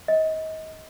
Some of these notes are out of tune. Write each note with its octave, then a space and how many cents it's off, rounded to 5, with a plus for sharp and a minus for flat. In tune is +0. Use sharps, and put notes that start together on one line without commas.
D#5 +30